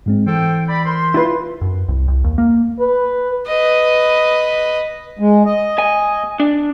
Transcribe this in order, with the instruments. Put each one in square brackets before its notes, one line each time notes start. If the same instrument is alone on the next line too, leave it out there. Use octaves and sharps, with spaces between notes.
[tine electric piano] G#2 G#3 C4
[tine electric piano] E3 [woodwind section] A4 C5 G5
[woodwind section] D5 B5
A#4 C5 C6
[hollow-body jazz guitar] E4 F4 B4
[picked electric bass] F#2
C2
C2
D#2
A#3
[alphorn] B4
[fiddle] B4 D#5
[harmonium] G#3
D#5
[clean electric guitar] G#5
D4